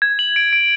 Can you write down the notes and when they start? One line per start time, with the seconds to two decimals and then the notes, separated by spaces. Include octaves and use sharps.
0.02 G#6
0.19 F#7
0.36 D7
0.53 D7